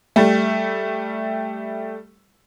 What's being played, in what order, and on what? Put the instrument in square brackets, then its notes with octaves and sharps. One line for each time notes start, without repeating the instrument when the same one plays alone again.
[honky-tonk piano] G3 A3